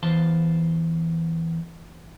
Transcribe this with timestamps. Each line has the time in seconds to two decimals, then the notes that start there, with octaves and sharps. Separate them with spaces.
0.03 E2 E3 C5 F5 A5 C6